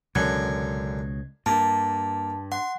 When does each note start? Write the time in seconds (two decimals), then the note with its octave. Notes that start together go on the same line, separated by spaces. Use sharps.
0.15 C#2 F#2 B2 D3 G#6
1.46 G2 A#3 A5
2.52 F#5 C6